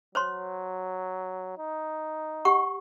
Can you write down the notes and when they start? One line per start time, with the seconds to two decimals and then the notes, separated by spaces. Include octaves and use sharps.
0.15 F#3 C5 C#5 C6
1.58 D#4
2.45 G4 F#5 C#6